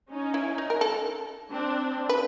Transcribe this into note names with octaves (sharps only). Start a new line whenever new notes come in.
C#4 D#4
E4
D#4
A#4
A4
C4 D4
B4